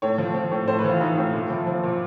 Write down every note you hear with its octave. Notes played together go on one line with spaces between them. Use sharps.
A2 C#5
F3
F3
A2
A2 C5
B4
E3
F4
E3 D#4
A2
A#2 E4
F3
F3
A#2